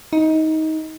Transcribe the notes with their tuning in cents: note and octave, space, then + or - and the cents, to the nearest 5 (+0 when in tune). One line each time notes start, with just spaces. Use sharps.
D#4 +20